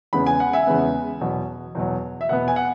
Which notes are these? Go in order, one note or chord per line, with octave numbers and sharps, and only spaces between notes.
E2 C#3 G#3 B3 B5
G#5
F#5
E5 G#5
E2 C#3 G#3 B3
E2 B2 F#3
E2 B2 F#3
E5
E2 B2 B3 F#5
G#5
F#5